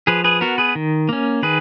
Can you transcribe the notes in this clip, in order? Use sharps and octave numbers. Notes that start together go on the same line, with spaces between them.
F3 G#4 B4
G#4 B4
B3 F#4 A#4
G#4 B4
D#3
A#3 C#4
D#3 G#4 B4